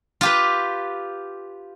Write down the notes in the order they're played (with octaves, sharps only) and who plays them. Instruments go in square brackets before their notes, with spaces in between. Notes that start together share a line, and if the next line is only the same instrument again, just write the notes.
[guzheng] F4 G4 B4